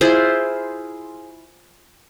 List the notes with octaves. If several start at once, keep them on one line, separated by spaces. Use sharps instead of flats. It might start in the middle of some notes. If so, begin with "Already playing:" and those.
E4 F4 G#4 C5